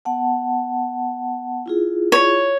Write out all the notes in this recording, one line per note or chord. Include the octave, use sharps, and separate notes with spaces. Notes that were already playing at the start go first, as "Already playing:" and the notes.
B3 F#5 A5
E4 F4 G#4
C#5